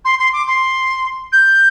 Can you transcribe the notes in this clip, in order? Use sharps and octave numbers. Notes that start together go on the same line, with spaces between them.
C6
C6
D6
C6
G6